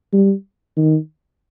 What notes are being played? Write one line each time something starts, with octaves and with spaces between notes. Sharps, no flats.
G3
D#3